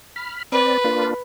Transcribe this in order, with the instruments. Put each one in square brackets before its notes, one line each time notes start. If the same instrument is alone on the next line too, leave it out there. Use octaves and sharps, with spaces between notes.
[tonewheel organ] B5 F6
[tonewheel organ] C4 D5 [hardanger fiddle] B4
[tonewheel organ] A#3 D4 F4